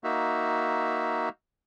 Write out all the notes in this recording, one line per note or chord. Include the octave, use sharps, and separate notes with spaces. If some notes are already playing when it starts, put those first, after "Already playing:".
A#3 D#4 F#4 E5